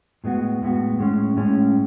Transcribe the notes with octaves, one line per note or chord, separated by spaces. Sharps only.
A2 G#3 B3 F#4
A2 G#3 B3 F#4
A2 G#3 C#4
A2 G#3 C#4